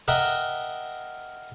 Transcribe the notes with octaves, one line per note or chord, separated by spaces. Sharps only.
A#4 D#5 E5 F#5 G5